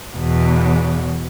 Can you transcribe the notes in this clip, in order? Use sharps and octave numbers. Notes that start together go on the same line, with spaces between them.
E2 B2